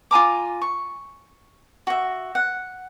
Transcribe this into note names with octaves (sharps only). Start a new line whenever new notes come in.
F4 G#5 A#5 D6
C#6
F#4 E5
F#5